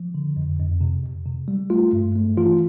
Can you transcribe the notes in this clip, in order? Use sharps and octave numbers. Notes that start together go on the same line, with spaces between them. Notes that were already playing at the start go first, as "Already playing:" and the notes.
Already playing: F3
D3
F2
F2
C3
F2
C3
G3
A3 F4
G2
A3
E3 F4